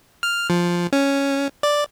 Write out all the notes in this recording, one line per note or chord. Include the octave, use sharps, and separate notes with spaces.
F6
F3
C#4
D5